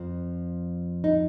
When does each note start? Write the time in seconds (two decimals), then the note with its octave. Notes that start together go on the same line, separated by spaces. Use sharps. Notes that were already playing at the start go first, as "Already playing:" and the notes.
Already playing: F2 F3
1.04 D#4